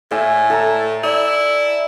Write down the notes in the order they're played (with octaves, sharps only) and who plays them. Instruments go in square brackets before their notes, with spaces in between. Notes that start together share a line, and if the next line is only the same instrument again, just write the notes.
[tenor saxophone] A2 [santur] E5 G#5
[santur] A4 A5 A#5
[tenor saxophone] E4 [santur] D5